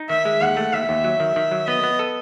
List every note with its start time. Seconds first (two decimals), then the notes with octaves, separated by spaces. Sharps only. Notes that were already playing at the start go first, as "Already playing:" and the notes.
Already playing: D#4
0.10 D#3 E5
0.25 G#3
0.41 D#2 F#5
0.57 A3
0.73 D#2 E5
0.89 D#2
1.04 F#3
1.20 D#3
1.36 D#3
1.52 F#3
1.67 B3 D#5
1.83 B3
1.99 A4